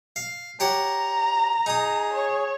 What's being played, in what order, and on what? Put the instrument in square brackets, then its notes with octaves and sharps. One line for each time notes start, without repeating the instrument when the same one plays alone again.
[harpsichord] F5
[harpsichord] G4 C#5 F#5 [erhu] A#5
[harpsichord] D#4 D#6 [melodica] G#4
[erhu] C#5